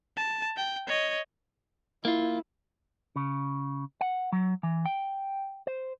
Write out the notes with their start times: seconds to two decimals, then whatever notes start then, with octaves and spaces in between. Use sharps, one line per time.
0.17 A5
0.57 G5
0.88 C#5 D#5
2.05 A#3 E4 F4
3.16 C#3
4.01 F#5
4.32 F#3
4.63 E3
4.86 G5
5.67 C5